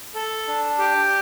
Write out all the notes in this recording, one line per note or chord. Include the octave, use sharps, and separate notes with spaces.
A4
D4
G4